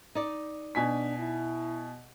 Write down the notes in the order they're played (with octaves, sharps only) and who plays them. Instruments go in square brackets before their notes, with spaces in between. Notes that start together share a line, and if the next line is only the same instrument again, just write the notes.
[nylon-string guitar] D#4 D5
[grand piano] B2 G#5 B6 [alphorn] D4
[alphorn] E4